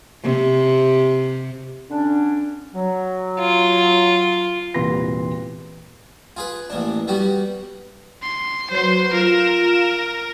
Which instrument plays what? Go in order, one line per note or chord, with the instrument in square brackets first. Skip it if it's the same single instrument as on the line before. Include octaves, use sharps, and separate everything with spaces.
[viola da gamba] C3
[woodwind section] D3 C#4 D4
F#3
[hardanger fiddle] F4
[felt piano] E1 C2 A#2 B4 C6 A#6
[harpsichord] F4 G#4 B4
A1 A#3 D4
G3 B3 F#4 G4
[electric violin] C6
[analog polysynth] F#3 B4 [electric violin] C5 C6
[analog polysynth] F4 E7 [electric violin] A#4